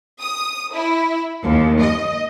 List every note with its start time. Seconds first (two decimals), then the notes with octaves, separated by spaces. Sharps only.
0.21 D#6
0.74 E4
1.43 D#2
1.80 D#5